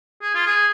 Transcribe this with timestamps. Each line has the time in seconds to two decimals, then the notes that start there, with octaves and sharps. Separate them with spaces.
0.22 G#4
0.35 F4
0.46 G#4